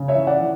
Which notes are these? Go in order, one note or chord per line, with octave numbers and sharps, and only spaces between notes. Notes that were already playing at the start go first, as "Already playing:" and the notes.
Already playing: C#3
C#5 E5
E3
D5 F#5
E3